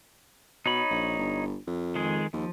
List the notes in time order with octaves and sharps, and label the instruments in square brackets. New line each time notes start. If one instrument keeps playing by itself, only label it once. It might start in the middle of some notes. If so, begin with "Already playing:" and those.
[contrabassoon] B2 [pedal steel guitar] D#4 C#5 B5
[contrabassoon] A#1
G1
F2
[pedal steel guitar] D#3 G#3 G#4
[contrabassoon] D#2 [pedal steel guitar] F3